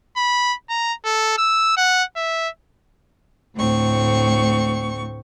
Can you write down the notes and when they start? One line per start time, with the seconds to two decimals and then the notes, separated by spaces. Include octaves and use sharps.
0.16 B5
0.69 A#5
1.05 A4
1.38 E6
1.77 F#5
2.16 E5
3.56 D2 A2 C4 C#6